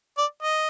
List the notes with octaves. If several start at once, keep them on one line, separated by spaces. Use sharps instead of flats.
D5
D#5